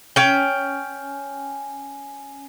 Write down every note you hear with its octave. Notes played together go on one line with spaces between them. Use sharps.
C#4 G5